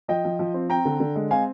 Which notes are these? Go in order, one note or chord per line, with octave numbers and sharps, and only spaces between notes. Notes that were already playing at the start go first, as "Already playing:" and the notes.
F3 D#5 G5
F3
F3
C4
C4 G5 A#5
D3
D3
G#3
C4 F5 G#5